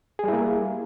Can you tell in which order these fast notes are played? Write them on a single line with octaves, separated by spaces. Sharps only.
G#4 G3 E4 A#3